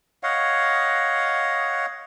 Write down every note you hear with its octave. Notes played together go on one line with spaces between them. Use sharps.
C#5 D#5 F5 F#5